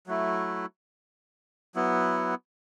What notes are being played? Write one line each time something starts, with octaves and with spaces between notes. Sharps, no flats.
F#3 A3 E4
F#3 B3 E4